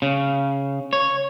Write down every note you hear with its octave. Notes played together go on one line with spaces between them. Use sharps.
C#3
C#5